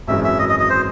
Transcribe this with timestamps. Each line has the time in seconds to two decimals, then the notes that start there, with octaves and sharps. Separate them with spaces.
0.07 G#1 F#2 E3 G#3 C#4 E5
0.24 E5
0.39 D#5
0.49 D#5
0.59 D#5
0.70 C5